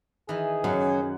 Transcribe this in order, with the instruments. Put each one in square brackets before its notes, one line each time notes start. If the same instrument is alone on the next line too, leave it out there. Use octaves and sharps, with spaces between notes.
[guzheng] D#3 E3 [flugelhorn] G#4
[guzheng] F#2 [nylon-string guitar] C#3 F#3 C#4